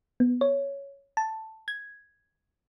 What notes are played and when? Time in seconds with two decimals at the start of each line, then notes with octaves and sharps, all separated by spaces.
0.20 B3
0.41 C#5
1.17 A5
1.68 G#6